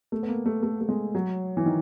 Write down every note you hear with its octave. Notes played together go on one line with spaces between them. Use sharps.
A3
B3
A#3
A3
A3
A3
G#3
F#3
E3
D#3